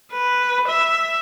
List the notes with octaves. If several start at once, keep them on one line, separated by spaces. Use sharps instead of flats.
B4
E5